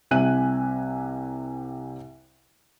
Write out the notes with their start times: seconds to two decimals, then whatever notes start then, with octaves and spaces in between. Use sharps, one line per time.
0.11 C2 C3 E5 G#5 F#6 D#7